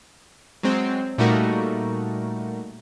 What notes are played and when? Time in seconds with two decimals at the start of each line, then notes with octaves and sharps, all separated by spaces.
0.63 F#3 G#3 C4
1.18 A#2 G3 A3 D#4 F#4 A#4